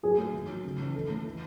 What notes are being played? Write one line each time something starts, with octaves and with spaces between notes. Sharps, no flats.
F#3 G#4
A3
D#3
F#3
C#3
E3
D#3 A4
A3
E3